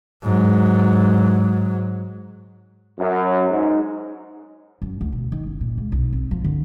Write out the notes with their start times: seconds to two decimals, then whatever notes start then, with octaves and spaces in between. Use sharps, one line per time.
0.23 G#2 F#3
2.98 F#2
3.50 G#2
4.82 F#2
5.01 D2
5.13 B2
5.32 D#3
5.47 F#1
5.61 A#2
5.77 C#2
5.92 B1
6.13 C4
6.31 F3
6.44 D3